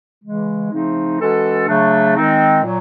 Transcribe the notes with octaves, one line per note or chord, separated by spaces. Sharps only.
C#3 E3 G#3
C#3 F3 A3 C4 D#4
E3 G#3 C#4 F#4 A4
C#3 F#3 A3 D4
D#3 G#3 C4 D#4
A#2 F#3